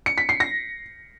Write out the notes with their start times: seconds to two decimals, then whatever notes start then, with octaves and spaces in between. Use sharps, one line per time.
0.06 C#7
0.18 B6
0.29 C7
0.40 A#6